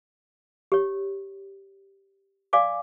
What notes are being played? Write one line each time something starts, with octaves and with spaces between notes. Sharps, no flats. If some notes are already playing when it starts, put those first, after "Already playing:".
G4 C#5
D5 F5 G#5 D6